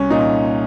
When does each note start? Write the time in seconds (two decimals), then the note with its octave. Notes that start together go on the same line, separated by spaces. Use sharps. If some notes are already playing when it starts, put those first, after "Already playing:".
Already playing: C2 C#4
0.10 A#2 D#4